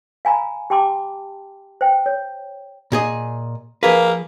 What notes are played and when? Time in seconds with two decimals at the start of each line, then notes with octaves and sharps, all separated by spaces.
0.25 F5 G#5 A#5 B5
0.70 G4 G5 A5 C6 D6
1.81 C5 G5
2.06 C#5
2.92 A#2 G#4 D#5
3.83 F3 A#3 G#4 B4